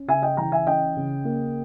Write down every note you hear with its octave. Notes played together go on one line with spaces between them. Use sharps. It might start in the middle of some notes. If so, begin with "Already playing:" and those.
Already playing: C#4
C#3 E5 G#5
D#5 G5
E3 G5 A#5
E5 G#5
C#4 D#5 G5
C#3
A#3